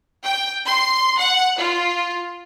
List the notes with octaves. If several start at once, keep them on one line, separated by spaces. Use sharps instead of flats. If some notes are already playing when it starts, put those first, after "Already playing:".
G5
C6
F#5
F4